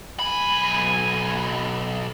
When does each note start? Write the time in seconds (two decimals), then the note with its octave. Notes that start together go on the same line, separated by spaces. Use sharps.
0.19 B1 G#5 B5